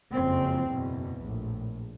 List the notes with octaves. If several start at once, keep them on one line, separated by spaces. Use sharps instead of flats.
F#1 F2 C#3 C4
F#1 E2 B2
A#1 A2